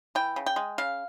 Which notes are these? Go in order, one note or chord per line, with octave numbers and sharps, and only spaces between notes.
E3 G5
C#3
G5
G#3
C#3 F5